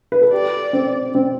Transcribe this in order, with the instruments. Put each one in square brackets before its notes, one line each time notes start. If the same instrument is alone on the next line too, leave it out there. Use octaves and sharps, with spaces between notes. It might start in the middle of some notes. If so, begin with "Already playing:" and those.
[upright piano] B4
A4
[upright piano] G4 [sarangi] D5
[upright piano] C4
C4